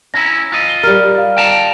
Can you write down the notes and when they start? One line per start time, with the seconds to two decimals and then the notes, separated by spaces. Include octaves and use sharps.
0.14 C#4 E4 A#5 A#6
0.52 F4 D#5
0.69 G7
0.83 G3 G4 A#4 F6
1.18 F5
1.37 G5 A5 A#5